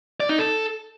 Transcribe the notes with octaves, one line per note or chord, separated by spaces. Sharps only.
D5
D#4
A4